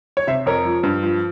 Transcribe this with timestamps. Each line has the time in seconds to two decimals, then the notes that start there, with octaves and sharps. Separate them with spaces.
0.17 C#5
0.27 C3 C5 E5
0.46 F2 A#4 C#5
0.65 F3
0.83 G2
1.03 F3